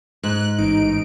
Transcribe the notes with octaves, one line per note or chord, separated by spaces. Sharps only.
G#2 F#6
A1 D#4 D7